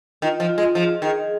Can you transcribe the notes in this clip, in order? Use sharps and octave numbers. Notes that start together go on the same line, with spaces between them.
D#3 F4
F3
F4
G#3
F3 G#4
D#3 G#4